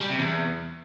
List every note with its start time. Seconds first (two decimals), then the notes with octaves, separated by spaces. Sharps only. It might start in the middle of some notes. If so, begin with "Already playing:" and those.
0.01 G3
0.10 C3
0.19 E2